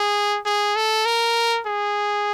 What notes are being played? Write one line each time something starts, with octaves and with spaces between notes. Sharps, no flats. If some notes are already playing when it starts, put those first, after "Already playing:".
Already playing: G#4
G#4
A4
A#4
G#4